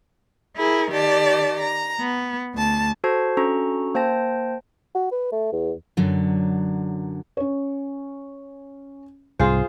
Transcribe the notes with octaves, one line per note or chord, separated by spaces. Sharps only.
E4 G#4 A#4
D#3 G4 D5 A5
A#5
B3
D2 A5
F#4 A4 C5 A5 G#6 C7
C#4 D4 F#4 A4 A#5 C#6
A#3 C5 G5 A5 A#6
F#4
B4
A3
E2
F#2 D3 F#3
C#4 C#5
C2 G#2 F4 G#4 C5